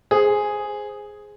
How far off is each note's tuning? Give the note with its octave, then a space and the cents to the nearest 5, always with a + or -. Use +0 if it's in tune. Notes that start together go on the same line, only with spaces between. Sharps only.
G#4 +0 C5 +0